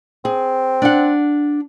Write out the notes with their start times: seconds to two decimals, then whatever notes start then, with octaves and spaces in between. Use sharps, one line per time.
0.25 C4 G#4
0.82 D4 F#5